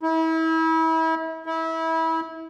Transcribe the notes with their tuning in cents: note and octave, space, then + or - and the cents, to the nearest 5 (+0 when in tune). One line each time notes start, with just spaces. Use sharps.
E4 -35
E4 -25